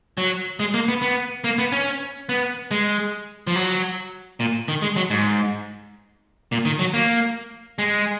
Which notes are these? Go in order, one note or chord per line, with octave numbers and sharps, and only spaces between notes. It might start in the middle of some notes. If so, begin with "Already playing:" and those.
F#3
G#3
A#3
B3
B3
A#3
B3
C#4
B3
G#3
F3
F#3
A#2
D#3
G#3
F#3
G#2
A#2
D#3
F#3
A#3
G#3